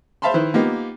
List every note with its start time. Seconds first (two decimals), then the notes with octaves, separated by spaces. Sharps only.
0.22 C5 E5 F5 A5 B5 C6
0.34 D#3 E4 B4 C5
0.54 A#3 B3 D#4 F4 G4